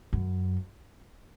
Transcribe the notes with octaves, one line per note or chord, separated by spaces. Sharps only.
F#2